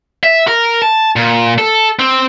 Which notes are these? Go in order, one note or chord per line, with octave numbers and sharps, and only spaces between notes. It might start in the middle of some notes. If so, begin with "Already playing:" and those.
E5
A#4
A5
A#2
A4
C4